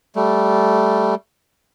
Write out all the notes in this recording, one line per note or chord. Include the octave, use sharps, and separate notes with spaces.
G3 A3